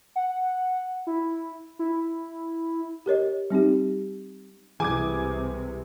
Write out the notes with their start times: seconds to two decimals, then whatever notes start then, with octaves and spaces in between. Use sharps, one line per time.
0.16 F#5
1.07 E4
1.79 E4
3.06 G4 A#4 C#5 D#5
3.50 G3 C4 D#4 G4
4.80 C2 C3 E3 G#4 G#5 D6 G#6